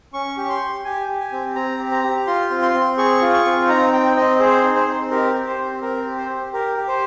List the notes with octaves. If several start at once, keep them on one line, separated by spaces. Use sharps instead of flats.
C#4 C#6
G4 C#6
C6
G4
G4 G#5
G4
G#5
C4
C4 A#5
G4
A#5
G4
F4 C6
C4
C6
C4
G#4 C#6
F4
C#6
C4
D#4 A#5
C4 G5
C4 D#5
G#4 C5
D#4
C5
C4
G4 A#4
G4
C5
C4
C4 A#4
G4
C5
G4
G4 A#4
G4
C5